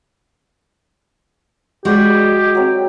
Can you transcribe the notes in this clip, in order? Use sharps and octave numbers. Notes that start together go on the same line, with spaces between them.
G#3 F#4 G4 C5 D5
F#3 C4